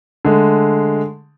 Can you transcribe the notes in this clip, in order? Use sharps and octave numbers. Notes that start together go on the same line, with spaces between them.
D3 G#3 A3